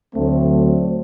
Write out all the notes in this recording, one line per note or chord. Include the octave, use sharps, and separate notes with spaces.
D2 D3 F#3 A3 C4